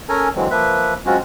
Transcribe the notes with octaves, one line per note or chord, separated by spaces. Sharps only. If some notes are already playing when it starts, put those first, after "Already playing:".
C#4 A4 A#4 G#5 A#5
D3 E3 F#3 G#3 C4
F3 A#3 B4 E5
F#3 G#3 C4 C#4 F4 F#4